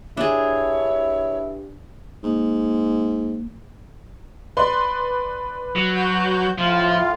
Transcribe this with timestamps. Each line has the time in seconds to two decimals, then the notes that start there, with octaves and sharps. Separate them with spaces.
0.17 G2 D4 E4 G#4 C#5
2.23 G#2 A#3
4.57 B4 D5 C6
5.76 F#3
5.95 F#4 G6
6.58 A2 F3 F4